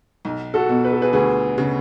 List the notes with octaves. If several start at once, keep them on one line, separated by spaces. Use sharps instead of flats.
B1
F#4 A4
B2
B4
A4
G#4 B4
D2 G#4 B4
C#3